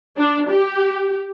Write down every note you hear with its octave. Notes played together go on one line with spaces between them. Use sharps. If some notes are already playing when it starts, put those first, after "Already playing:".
D4
G4